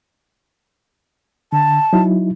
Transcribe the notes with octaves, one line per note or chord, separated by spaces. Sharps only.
D3 A5
F#3 D#4 E4